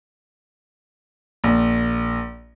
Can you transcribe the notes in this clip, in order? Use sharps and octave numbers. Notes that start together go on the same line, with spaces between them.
A#1